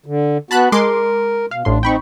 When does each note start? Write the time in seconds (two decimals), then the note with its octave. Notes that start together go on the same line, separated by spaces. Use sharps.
0.06 D3
0.51 B3 F#4 A5 B5 F#6
0.72 G#3 A#4 C6 D6
1.51 B2 F5
1.65 A1 A2 D4 C6
1.83 C4 D#4 G5 B5 C#6